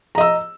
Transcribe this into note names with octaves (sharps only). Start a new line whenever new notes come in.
D#5 A#5 E6